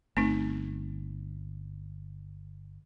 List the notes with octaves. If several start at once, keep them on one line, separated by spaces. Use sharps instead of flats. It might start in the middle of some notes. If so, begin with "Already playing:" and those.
G1 A3 C4 D#4